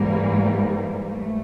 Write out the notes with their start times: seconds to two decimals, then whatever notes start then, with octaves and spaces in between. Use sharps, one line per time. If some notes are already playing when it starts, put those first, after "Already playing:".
Already playing: G#2 E3 G3 A#3
1.08 A3